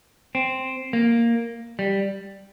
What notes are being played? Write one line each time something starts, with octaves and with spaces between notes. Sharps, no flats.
C4
A#3
G3